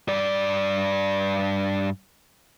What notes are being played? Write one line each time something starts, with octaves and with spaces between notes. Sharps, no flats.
G2 D5